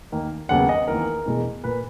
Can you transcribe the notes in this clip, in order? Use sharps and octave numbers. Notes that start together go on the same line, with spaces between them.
D#2 D#3 A#3
D#2 C#3 F#3 B3 F#5
D#5
E2 D#3 A#3 A#4
E2 B2 G#3
A#2 A#3 B4